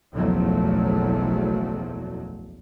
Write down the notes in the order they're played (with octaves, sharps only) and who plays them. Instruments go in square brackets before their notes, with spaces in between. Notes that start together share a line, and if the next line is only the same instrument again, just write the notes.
[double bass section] F#1 B1 E2 F3 F#3 A3